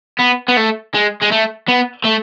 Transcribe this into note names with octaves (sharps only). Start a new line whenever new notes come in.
B3
B3
A3
G#3
G#3
A3
B3
A3